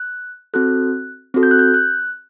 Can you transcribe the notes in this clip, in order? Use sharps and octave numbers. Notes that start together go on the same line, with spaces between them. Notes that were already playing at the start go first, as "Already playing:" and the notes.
Already playing: F#6
C4 F#4 A4 F#6
C4 F#4 A4
G6
F#6
G6
F#6